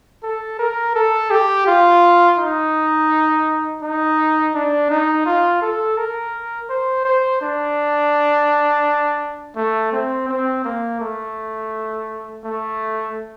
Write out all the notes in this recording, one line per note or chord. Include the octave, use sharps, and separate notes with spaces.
A4
A#4
A4
G4
F4
D#4
D#4
D4
D#4
F4
A4
A#4
C5
C5
D4
A3
C4
C4
A#3
A3
A3